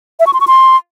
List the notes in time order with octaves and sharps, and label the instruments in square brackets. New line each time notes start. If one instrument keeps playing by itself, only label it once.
[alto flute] E5
C#6
C6
C#6
C6